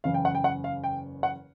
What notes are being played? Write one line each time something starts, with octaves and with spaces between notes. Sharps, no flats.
F#1 E2 C#3 F5
G5
F#5
G5
F#5
F5
G5
F#5